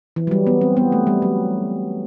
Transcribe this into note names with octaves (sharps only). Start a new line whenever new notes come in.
E3
F#3
G3
B3
C4
B3
A3
G3
F#3